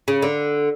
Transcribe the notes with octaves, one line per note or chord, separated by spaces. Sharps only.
C#3
D3